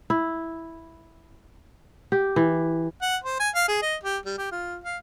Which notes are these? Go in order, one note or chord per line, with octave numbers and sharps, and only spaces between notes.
E4
G4
E3
F#5
C5
G#5
F5
G#4
D#5
G4
G3
G4
F4
F5